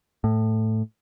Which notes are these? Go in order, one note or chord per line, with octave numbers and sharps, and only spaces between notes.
A2